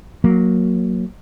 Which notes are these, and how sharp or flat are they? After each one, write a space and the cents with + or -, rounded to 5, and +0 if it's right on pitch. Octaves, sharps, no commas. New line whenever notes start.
F#3 -10 A#3 +0